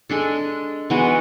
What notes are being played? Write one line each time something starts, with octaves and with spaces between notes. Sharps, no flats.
G#3 D4 A4
E3 G#3 B3 F#4